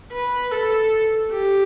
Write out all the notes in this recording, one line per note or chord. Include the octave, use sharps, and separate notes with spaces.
B4
A4
G4